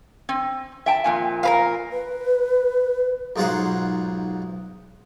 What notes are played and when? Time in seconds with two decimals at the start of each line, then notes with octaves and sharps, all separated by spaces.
0.29 C4
0.86 E5 G5 A5
1.04 F2 A#2 G#5
1.43 A#4 B4 F5
1.90 B4
3.36 B1 G#2 F4 G#4 C5 F#5